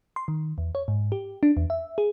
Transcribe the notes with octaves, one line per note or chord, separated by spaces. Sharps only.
C6
D#3
E2
C#5
G#2
G4
D4
E2
E5
G#4